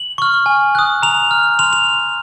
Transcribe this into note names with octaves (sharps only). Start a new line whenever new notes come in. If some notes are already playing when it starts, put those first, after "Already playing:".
Already playing: F#7
C#6 F6
G#5
D#6 F#6
A#5 F7
F6
C6 F7
F7